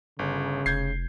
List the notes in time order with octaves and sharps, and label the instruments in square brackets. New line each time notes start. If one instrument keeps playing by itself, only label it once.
[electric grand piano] G1 [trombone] C#3
[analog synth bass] F1 [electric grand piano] G6 G#6 C7